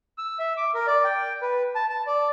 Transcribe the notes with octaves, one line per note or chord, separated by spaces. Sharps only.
E6
E5
D6
A#4
D5
G5
B4
A5
A5
D5